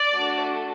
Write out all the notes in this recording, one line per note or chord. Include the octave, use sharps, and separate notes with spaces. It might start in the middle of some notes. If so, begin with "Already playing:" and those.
Already playing: D5
A3 D4 F#4 A4